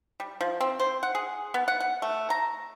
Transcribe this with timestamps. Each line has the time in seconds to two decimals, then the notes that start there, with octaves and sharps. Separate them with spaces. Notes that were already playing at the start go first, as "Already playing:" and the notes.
0.20 G3
0.41 F3
0.61 C4
0.79 C5
1.03 F#5
1.15 G#4
1.54 B3
1.68 F#5
1.80 F#5
2.02 A3
2.30 A#5